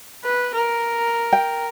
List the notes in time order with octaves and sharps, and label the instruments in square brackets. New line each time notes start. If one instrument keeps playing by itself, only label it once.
[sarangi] B4
A#4
[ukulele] G5